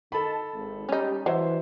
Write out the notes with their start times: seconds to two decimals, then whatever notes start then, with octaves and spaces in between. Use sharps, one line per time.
0.12 D#3 A4 D#5 A5 B5
0.54 G#1
0.89 G3 C#4 D#4
1.26 E3 F#3 C5 E5